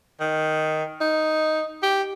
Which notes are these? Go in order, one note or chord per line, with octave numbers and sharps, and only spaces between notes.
D#3
D#4
G4